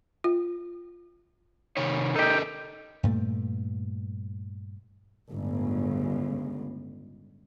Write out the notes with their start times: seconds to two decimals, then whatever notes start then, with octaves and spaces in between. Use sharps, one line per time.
0.24 F4
1.77 C3 D#3 C#5
2.16 D#4 G4 A4 A#4 D#5
3.03 G2 A#2 A3
5.30 G1 C#2 A2